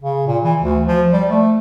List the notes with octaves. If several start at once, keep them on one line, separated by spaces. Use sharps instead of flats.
C#3
A#2
E3
D2
F3
G3
A3